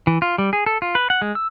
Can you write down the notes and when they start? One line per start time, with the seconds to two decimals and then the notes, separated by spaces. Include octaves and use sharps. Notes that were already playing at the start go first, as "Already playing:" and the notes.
0.07 E3
0.22 F4
0.38 G3
0.53 G#4
0.66 A4
0.82 F4
0.95 B4
1.10 F#5
1.22 G#3
1.35 E6